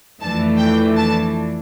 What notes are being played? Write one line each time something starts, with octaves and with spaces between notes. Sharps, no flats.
F2 E3 A3 D4 A5
G5
A5